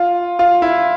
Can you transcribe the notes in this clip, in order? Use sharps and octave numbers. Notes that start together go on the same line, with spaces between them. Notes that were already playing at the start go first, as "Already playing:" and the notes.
Already playing: F4
F4
E4